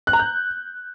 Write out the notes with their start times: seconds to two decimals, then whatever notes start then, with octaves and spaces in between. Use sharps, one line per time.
0.07 F#6
0.13 A#5
0.19 G6